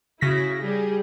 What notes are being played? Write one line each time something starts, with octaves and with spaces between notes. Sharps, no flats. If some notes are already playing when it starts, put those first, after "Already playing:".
C#3 E4 F#4 A#6 B6
G3 G4 G#4